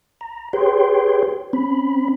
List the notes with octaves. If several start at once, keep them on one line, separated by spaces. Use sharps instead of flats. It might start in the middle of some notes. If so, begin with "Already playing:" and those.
A#5
G4 G#4 B4 C#5 G5 C6
C4 C#4 B5